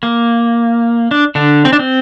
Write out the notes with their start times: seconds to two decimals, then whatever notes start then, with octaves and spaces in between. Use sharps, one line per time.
0.03 A#3
1.11 D4
1.35 D3 D4
1.65 C4
1.73 D4
1.79 C4